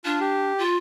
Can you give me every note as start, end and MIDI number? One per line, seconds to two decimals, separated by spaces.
0.05 0.52 62
0.05 0.19 65
0.21 0.63 67
0.58 0.77 65